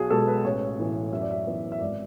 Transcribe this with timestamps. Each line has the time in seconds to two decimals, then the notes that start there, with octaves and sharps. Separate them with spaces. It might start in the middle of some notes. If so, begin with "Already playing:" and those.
Already playing: B1 F#4 G#4
0.10 B2 G#3 B3 A4
0.28 B4
0.44 A1 C#5
0.79 A2 E3 B3
1.13 F#2 E5
1.22 D5
1.31 E5
1.47 E3 B3
1.72 E5
1.81 G#1 D5